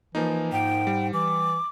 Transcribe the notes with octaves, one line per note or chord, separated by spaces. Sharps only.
E3 F3 A#3 D#4
G#2 G5
G3
E3 D6